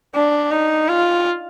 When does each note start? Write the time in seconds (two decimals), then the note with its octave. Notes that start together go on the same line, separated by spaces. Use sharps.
0.15 D4
0.51 D#4
0.88 F4